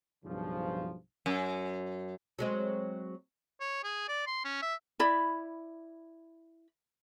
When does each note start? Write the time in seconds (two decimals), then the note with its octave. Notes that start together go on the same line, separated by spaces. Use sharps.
0.25 B1 G2 C#3 F3
1.26 F#2
2.39 F#3 G#3 C4
3.61 C#5
3.84 G#4
4.08 D5
4.27 C6
4.45 C#4
4.62 E5
4.99 E4 D5 B5